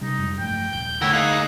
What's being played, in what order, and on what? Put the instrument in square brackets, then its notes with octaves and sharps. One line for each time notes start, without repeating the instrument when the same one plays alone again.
[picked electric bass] C3 G3 [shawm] D#4
[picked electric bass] F2 G3 G#3
[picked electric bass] G2 F3 A3 [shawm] G5
[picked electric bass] D#1 [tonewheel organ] G6
[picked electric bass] D3 A3 [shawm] E4 [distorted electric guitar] A#4 C#5 [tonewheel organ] F#5 G5 E6
[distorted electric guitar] A#3 D#4 [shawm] G#4 [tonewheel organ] F5 F#6